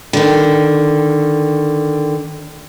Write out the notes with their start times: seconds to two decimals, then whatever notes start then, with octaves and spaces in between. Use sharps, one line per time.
0.13 D3 D#3